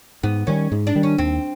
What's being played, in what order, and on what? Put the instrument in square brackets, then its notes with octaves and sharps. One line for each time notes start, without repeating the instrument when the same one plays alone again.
[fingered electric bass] G#2 [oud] B3
[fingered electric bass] D#3 G3 [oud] C#4
[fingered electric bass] G#2
[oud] D4
[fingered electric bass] D#3 G3
[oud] C#4
[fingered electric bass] D#2 [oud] C4